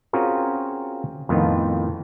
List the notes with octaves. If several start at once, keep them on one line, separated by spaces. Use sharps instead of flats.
C4 C#4 F4 F#4 G#4 A#4
F2 A2 D#3 B3 F4